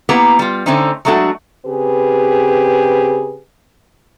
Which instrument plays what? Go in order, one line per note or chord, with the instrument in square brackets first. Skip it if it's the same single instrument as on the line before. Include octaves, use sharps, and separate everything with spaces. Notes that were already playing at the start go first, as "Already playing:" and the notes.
[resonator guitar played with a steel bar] A#3 B3 E4 G4 A#5
G3 F4
D3 A3 C4 C#4 D#4
F#3 G#3 A3 D4 F#4
[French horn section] C#3 C4 G4 G#4 B4